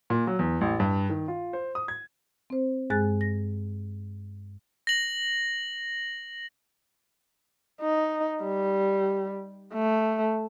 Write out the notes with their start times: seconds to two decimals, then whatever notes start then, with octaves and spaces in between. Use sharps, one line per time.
0.10 A#2
0.27 F#3
0.39 E2
0.61 A1
0.80 G2
1.10 D#3
1.28 F4
1.53 C5
1.75 D#6
1.88 G#6
2.50 C4 C5
2.90 G2 G#3 G#4 G#5 F#6 A6
3.21 A#6
4.87 A#6 F#7
7.81 D#4
8.43 G3
9.74 A3